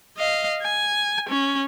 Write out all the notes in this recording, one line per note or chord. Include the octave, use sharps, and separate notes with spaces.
D#5 F5
G#5
C#4